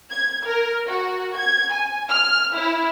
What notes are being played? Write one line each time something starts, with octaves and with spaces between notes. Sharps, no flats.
G#6
A#4
F#4
G#6
G#5
F6
E4